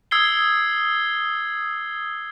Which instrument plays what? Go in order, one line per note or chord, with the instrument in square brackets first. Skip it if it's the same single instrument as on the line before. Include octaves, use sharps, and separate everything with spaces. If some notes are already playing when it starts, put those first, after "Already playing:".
[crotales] D#6 E6 G#6 C7 G7